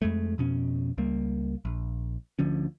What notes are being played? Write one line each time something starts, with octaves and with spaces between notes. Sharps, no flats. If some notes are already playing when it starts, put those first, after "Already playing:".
F2 G#3 A3
F2 B2 C#4
C#2 G3 A#3
A#1
D2 D3 F3 C#4